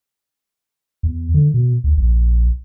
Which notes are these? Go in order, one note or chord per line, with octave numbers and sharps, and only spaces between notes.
E2
D3
B2
D2
A#1